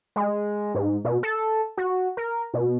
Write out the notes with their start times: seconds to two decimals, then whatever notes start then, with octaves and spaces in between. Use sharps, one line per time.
0.16 G#3
0.75 G#2
1.05 B2
1.23 A4
1.77 F#4
2.17 A#4
2.54 B2